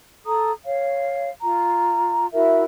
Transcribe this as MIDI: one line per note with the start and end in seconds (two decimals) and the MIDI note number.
0.26 0.52 69
0.26 0.52 82
0.26 0.52 87
0.65 1.31 73
0.65 1.31 77
1.42 2.26 65
1.42 2.26 82
2.33 2.63 64
2.33 2.63 66
2.33 2.63 70
2.33 2.63 76